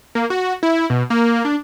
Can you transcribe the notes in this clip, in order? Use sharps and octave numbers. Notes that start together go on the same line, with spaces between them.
A#3
F#4
E4
B2
A#3
D4